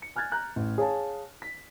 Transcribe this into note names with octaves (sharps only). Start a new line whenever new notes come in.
C#7
G#5 F6 F#6 G#6 A6
A#5 F#6 G6
A1
G#4 C#5 F5 A5
B6